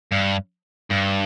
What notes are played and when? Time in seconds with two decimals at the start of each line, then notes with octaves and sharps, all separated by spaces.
0.12 G2
0.91 G2